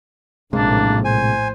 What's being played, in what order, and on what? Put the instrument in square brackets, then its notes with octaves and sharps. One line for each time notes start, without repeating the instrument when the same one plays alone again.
[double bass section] A#1 A2 [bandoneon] F#2 A#3 [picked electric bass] C3 G#3 [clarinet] D4
[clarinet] C5 [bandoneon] G#5